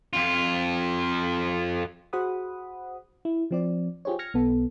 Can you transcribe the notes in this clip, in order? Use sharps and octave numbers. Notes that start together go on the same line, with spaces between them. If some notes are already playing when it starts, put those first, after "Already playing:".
F2 F4
F#4 G#4 C5 F#5 B5 D#6
E4
F3 C4 D5
F4 G4 G#4 C5 C#5
F6 G#6 A#6 C#7
B1 B3 A4